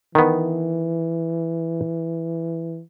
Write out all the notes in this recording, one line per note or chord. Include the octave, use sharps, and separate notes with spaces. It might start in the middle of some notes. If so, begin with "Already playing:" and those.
D#3 E3 B3